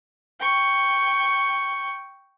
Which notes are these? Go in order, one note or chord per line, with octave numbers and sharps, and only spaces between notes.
G5 C#6